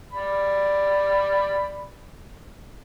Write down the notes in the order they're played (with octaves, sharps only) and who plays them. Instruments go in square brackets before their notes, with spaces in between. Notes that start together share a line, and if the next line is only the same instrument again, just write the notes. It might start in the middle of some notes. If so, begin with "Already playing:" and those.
[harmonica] D5 B5